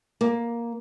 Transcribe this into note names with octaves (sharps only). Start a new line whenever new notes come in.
A#3